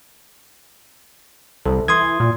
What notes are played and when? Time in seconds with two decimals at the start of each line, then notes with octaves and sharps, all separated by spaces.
1.66 C2 A4
1.88 E3 C6 D#6 G#6
2.20 A#2